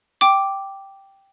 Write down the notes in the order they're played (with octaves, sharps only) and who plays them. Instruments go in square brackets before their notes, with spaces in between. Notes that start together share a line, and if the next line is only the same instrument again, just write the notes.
[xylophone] G5 D6